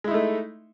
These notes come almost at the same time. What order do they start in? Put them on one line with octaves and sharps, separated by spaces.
G#3 E4 D#4 A3